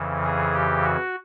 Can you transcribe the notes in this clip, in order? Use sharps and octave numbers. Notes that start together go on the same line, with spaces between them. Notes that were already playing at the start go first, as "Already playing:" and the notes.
Already playing: F2 C#3 E3
G#4
G4
F#4